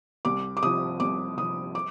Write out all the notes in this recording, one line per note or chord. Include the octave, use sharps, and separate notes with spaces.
C2 D6
D6
C3 F3 D#6
C2 D6
C3 F3 D#6
D6